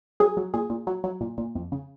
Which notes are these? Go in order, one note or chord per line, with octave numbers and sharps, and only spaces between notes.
F#3 G#4
F#3
A#2 G#4
A#2
F#3
F#3
A#2
A#2
F2
C#3